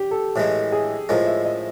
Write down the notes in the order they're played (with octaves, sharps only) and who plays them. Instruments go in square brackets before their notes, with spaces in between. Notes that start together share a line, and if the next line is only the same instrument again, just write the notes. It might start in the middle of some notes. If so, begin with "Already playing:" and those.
Already playing: [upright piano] G4
A4
[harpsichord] A2 E3 G#3
[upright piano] G#4
[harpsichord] A2 F3 G#3 [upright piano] A#4
[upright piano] E5
D#5